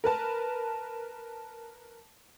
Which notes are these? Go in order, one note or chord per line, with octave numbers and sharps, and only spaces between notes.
A#4 B4 A5